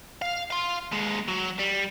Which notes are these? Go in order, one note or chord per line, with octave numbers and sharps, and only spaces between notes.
F5
F5 C6
D#2 G#3
F#3
G3